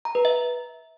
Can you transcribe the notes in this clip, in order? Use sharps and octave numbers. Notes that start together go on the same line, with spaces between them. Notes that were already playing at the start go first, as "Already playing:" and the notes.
A#5
B4
E5